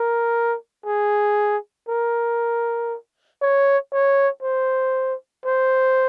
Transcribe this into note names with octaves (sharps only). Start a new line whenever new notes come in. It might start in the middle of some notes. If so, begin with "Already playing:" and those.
Already playing: A#4
G#4
A#4
C#5
C#5
C5
C5